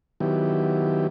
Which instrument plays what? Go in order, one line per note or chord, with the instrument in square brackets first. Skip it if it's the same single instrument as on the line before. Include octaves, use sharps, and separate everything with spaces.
[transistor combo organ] D#3 F#3 B3 E4 G4